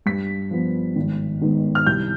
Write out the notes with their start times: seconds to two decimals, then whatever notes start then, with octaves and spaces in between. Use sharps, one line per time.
0.06 G2 B6
0.51 F3 B3
0.96 G#1
1.41 G#2 D#3 B3
1.75 F6
1.86 C2 G6